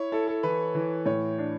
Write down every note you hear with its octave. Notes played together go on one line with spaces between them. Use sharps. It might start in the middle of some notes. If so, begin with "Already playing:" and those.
Already playing: E4 C#5
E4 A4
A4
E3 B4
E3
A2 C#5
D4